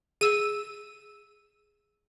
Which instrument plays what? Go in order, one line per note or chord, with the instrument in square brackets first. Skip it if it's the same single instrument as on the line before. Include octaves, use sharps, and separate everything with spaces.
[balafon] G#4 [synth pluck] E6 D#7